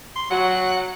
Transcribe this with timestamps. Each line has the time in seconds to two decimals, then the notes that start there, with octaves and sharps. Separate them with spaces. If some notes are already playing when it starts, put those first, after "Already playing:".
0.16 C6
0.31 F#3 F#4 F#5